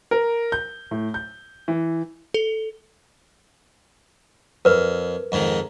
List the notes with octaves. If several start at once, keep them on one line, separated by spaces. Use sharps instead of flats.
A#4
G6
A2
G6
E3
A4
F2 A#4 B4
F2 G#2 D#3